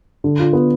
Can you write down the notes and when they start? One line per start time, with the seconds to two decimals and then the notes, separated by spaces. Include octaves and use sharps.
0.24 D3
0.39 F4
0.53 B3